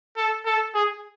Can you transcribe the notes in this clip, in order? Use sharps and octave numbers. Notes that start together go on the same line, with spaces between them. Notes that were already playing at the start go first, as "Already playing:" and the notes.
A4
A4
G#4